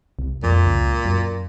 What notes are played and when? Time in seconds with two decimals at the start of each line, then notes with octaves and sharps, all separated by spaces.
0.19 C2
0.43 F2 A#2
0.66 C#2
1.05 F#2